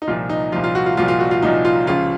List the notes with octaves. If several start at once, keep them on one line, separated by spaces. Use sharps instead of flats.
D#4
C2 A#2 F3 F4
D#4
C2 A#2 F3 F4
F4
F#4
F4
C2 A#2 F3 F4
F4
F#4
F4
C2 A#2 F3 D#4
F4
C#2 C#3 F3 F4